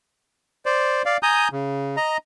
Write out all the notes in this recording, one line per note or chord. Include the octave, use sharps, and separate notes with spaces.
C5 D5
D5 F5
G#5 A#5 D#6 G6
C#3
D#5 A#5